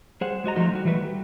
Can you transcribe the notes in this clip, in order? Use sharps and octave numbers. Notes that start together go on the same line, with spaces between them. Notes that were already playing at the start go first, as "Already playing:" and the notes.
G3 G#4 C5 F#5
G#3 F#4 D#5 A#5
F3 G#3 A3 D#4 F#4
G3 F#4
E3 F#3 A3 F#4 B4
G3